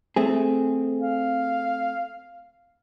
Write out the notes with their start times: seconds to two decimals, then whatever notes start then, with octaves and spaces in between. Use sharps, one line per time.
0.16 A3 C4 G#4
1.02 F5